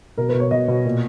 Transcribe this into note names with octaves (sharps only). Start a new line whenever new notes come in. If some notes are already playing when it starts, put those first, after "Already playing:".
B2 A#4
B4
B2
C#5
B2 D#5
B2
A#2